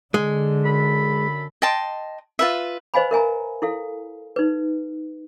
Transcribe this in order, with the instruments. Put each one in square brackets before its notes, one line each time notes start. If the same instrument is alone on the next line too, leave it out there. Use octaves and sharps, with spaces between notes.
[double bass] D3 [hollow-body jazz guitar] G#3
[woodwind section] F#2 A4 B5
[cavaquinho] D#5 G5 A5 C6
F4 B4 E5
[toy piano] B4 C5 D#5 F5 G#5 B5
A#4 E5 G#5 A#5
E4 A4 F5
D#4 B4